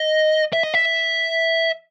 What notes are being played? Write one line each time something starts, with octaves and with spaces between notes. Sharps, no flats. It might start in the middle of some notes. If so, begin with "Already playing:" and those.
Already playing: D#5
E5
D#5
E5